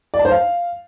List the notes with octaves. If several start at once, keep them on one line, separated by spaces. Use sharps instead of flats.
D5
A5
C5
F5